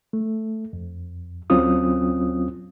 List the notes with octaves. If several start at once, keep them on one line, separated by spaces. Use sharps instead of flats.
A3
F2
D2 F#3 C4 C#4 F4 D#6